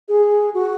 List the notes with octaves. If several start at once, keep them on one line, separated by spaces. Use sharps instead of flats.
G#4
F#4